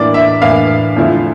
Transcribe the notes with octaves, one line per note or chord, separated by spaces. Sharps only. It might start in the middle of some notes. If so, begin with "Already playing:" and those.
Already playing: A2 E3 A#3 D4 D5
E5
A2 E3 A#3 D4 F5
E2 D3 F3 A3 E4